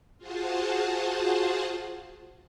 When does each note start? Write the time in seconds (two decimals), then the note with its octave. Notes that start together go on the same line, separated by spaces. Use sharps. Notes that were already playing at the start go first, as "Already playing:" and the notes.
0.18 F4 F#4 G#4 C5 F#5 A5